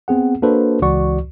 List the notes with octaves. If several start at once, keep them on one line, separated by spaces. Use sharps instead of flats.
B3 C4 G#4 F#5
A#3 D4 F#4 A4 B4 C5
C#2 E3 F#4 D5 C#6